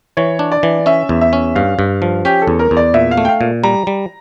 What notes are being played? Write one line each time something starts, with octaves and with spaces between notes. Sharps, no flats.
E3 C#5
D4
D5
E3
C#4 E5
E2
E5
C#4
G2 F5
G2
F3
C#4 G4
A4
E2
A#4
E2
D5
A#2 E5
F5
A3
G5
F5
A#2
G3 A#5
G3